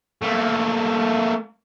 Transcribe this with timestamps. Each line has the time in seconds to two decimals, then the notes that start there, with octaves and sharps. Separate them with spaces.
0.22 A3 A#3